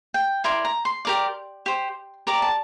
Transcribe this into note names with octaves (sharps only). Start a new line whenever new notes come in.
G5
E4 A#4 D5 C6
A#5
C6
G4 A#4 D5
G4 C5
G4 A#4 D5 A#5
A5